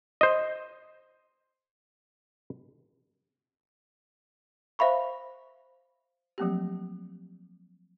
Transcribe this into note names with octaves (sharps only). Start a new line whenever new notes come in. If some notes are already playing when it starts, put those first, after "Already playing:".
C5 D#5
C5 E5 F5 B5 C#6
F3 F#3 A3 A#3 C4 G4